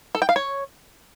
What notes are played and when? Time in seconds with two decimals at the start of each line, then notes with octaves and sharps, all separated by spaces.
0.15 A4
0.22 G5
0.29 F5
0.36 C#5